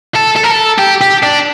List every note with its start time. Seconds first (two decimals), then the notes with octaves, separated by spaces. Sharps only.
0.15 A4
0.36 A4
0.44 A#4
0.51 A4
0.79 G4
1.01 G4
1.23 D4